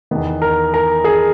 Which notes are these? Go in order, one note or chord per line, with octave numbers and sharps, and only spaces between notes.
E2 D#3 B3
A#4
A#4
G#4